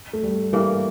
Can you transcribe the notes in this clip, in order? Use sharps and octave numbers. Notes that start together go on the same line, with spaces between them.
A3
G3
G2 E3 A#3